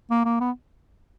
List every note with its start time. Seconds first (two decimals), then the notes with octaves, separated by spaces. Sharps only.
0.11 A#3
0.25 A#3
0.41 B3